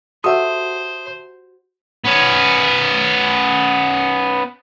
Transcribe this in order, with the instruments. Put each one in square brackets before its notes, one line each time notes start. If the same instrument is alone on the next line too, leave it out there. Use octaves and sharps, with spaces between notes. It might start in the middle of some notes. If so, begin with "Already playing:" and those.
[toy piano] F#4 G4 F#5 [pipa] A4 E5 [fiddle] C5 [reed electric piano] D#6
[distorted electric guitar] B3 C#4